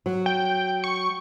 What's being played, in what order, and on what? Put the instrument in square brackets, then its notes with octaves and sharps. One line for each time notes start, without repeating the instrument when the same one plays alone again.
[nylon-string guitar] F#3
[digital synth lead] G5
C#6